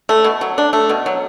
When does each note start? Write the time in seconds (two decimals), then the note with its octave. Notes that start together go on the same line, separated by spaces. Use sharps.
0.09 A3
0.24 B2
0.41 F#3
0.58 D4
0.73 A3
0.89 B2
1.06 F#3